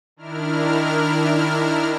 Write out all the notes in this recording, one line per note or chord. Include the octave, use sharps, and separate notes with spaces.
D#3 D4 E4 A#4 F6